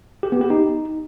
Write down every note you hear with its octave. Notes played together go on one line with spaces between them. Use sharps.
G4
B3
G4
D#4